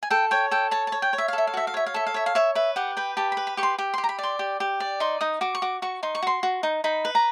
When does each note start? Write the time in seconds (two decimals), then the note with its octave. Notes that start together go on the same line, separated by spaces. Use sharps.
0.03 G#5
0.10 A4 G5
0.31 C#5 G5
0.51 A4 G5
0.71 C#5 A5
0.87 A5
0.92 C#5
1.02 G5
1.13 C#5
1.18 E5
1.28 F5
1.33 A4 E5
1.47 F5
1.54 F#4 E5
1.67 F5
1.74 C#5 E5
1.86 F5
1.94 A4 E5
2.07 F5
2.14 C#5 E5
2.26 F5
2.35 C#5 E5
2.55 B4 E5
2.76 G4 F#5
2.97 B4 G5
3.17 G4 A5
3.32 B5
3.37 B4
3.47 B5
3.57 G4 C#6
3.63 C6
3.78 G4
3.94 G4 C6
4.04 A#5
4.09 B5
4.18 D5 C6
4.39 G4
4.60 G4
4.80 D5
5.00 D#4 C6
5.21 D#4 D#6
5.41 F#4 D6
5.55 C#6
5.62 F#4 D6
5.82 F#4 C#6
6.03 D#4 C6
6.15 C#6
6.22 F#4 C6
6.43 F#4
6.63 D#4
6.84 D#4 B5
7.05 B4
7.15 A#5